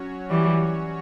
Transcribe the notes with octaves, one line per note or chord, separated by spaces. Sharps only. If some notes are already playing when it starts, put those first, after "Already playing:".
Already playing: F#3 C#4 F#4 C#5
E3 G3